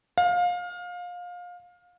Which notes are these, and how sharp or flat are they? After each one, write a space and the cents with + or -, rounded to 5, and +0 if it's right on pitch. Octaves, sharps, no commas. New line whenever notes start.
F5 +25